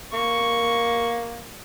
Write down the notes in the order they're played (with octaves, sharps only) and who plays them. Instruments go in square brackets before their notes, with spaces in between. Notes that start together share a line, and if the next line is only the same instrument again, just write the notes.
[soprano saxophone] A#3 [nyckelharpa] C#6